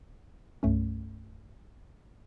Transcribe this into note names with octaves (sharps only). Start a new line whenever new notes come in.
C2 G2 A3 C#4